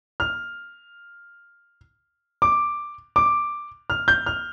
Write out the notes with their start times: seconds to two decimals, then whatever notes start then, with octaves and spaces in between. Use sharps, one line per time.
0.20 F6
2.42 D6
3.16 D6
3.90 F6
4.08 G6
4.26 F6